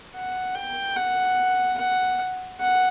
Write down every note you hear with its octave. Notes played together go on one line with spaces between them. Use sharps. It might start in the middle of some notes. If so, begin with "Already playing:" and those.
F#5
G5
F#5
F#5
F#5